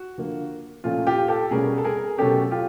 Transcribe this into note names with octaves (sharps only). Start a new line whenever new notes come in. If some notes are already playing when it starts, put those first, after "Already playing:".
Already playing: F#4
D3 F3 A#3
A#2 F3 A3 C#4 F4
F4 G4
G4 A4
B2 G3 A#3 C#4 G#4 A#4
A4
G#4 A#4
B2 F#3 A3 C#4 G4 A4
F4 G4